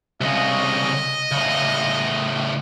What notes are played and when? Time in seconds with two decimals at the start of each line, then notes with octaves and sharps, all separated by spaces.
0.21 C2 C#3 D#5
1.32 A2 C#3